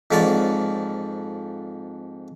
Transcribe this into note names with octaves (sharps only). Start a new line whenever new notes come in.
F2 G#2 A#3 C#5 D5